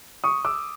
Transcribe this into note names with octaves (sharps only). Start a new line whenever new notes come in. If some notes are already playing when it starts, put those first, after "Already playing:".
C#6 D#6
D6 E6